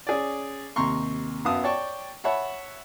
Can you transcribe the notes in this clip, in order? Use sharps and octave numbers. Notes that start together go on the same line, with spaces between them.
C#4 G#4 D5
D#2 C3 A#5 C6 C#6
F#2 B3 F5 A5 D#6
C#5 D5 G5 A5 C#6
C#5 E5 F#5 A5 B5